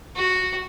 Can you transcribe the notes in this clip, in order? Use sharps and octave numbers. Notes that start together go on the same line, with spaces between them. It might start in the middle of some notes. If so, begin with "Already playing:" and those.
F#4